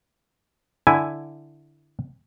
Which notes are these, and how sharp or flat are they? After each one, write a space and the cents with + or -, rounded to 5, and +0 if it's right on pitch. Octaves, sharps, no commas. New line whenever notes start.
D3 +0 E4 +0 G#5 +0